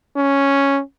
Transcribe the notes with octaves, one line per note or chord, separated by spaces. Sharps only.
C#4